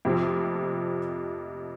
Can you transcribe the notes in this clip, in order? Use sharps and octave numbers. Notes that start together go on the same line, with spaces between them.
F2 C3 F3